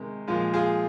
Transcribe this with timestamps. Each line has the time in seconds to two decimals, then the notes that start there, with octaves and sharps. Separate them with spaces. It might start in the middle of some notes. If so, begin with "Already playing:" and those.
Already playing: C3 D#3 G#3
0.27 A#2 F3 G#3 F4
0.54 F4 G#4